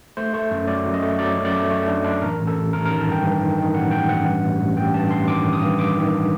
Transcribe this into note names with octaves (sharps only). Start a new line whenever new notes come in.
A3 C5
A3
F#2
F#3 D5
F#2
D#5
A3
F#3 D5
F#2
D5
A3
A3
D4
D4
A1 A#4
A1
A4
A1
A1 A#4
A#4
D#3
A5
G2 G5
G2
D#3
D#3
A1 F#5
A1 G5
A1 F#5
G2
A1
A1
A1 G5
G2 A5
A1 C6
D#3 D6
A1
D#6
G2
G2 D6
D#3